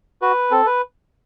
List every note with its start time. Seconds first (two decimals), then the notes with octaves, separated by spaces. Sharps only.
0.22 F#4 B4
0.51 C4 A4
0.66 B4